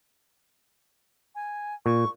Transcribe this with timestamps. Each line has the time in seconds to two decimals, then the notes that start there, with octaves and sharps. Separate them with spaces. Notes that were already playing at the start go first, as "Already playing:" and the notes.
1.35 G#5
1.86 A#2 C#6